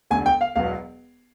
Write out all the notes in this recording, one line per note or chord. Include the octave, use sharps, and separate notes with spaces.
E1 D2 D3 G#5
G5
F5
E1 E2 B2 F#3 B3 F5